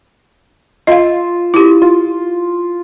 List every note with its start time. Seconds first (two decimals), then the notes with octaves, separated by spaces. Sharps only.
0.87 F4 D#5 F5 E6
1.54 E4 G4
1.82 F4